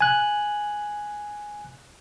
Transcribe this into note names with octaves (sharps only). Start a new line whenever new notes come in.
G#5 F#6